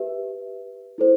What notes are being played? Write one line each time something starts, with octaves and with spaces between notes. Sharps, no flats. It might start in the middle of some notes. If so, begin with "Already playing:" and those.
Already playing: G4 B4 E5
E4 A4 C5